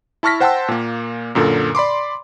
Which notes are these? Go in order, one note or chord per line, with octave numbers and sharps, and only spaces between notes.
E4 A5 C#6 F6 A#6 B6
C5 F#5 G5 A5 C6 E6
A#2 A#3
F#2 A#2 D3 A4 A#4
D5 B5 C6 D6